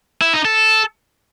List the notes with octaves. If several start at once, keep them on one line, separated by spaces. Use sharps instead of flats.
E4
D#4
A4